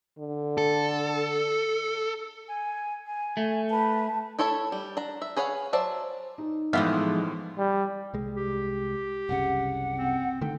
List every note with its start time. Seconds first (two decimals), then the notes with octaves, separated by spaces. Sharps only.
0.19 D3
0.58 A4
2.48 G#5
3.06 G#5
3.37 A3
3.70 B4 A5
4.39 E4 A4 C#5 E5 A5
4.72 G3
4.97 D4 A#5
5.22 E5
5.37 G#4 B4 C#5 F5 F#5
5.73 F#3 C5 D5 E5 A5
6.38 D#4
6.73 A2 E3 F3 G#3 B3 G4 E5 F5
7.58 G3
8.14 C2 G#3
8.36 G4
9.29 F#1 C2 C#3 F#5
9.98 C4
10.41 D3 D#3 A3 G5